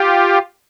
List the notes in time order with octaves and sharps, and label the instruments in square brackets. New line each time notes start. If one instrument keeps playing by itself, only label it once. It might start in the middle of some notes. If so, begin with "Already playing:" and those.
Already playing: [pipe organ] F4 G4